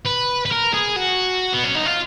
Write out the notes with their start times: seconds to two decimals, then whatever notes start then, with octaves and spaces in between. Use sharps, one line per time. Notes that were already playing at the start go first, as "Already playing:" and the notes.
0.06 B4
0.45 B4
0.51 A#4
0.73 G#4
0.96 F#4
1.54 B3
1.64 C#4
1.75 D#4
1.86 F4